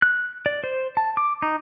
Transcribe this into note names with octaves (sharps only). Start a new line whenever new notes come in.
F#6
D5
C5
A5
D6
D#4